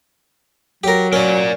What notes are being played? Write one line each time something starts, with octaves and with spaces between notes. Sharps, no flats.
F#3 G4 A#4
C#4 A#4 D5